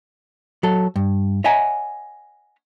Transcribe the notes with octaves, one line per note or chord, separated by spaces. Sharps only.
F#3 A4
G2
C#5 D#5 E5 F#5 G#5 A#5